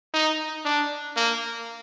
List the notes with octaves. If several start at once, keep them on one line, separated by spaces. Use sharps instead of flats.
D#4
D4
A#3